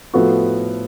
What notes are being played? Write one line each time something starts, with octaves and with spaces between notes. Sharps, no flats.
A2 F3 B3 F#4 A4